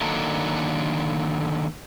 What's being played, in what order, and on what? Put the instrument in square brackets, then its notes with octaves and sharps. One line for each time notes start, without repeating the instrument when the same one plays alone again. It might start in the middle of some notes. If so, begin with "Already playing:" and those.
[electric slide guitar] D3 D#3 F#3 A#3 D4 A4